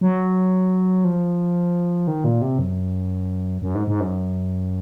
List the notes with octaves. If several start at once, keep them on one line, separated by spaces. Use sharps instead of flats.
F#3
F3
D#3
A#2
C3
F#2
F#2
G#2
G#2
F#2